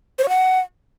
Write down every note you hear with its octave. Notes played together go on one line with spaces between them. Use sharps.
C5
C#5
F#5